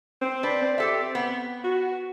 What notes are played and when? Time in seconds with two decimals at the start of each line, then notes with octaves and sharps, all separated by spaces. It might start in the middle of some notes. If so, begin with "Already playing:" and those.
0.21 C4
0.43 D4 B4
0.62 C4
0.78 G4 A4 E5
1.15 B3
1.64 F#4